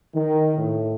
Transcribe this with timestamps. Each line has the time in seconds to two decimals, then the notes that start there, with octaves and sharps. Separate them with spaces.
0.14 D#3
0.56 A2